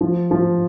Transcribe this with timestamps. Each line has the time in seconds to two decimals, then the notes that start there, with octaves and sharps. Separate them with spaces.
0.01 F3
0.31 F3